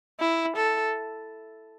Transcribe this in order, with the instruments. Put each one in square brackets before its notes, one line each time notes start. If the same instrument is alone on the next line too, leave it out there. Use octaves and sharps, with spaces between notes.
[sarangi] E4
A4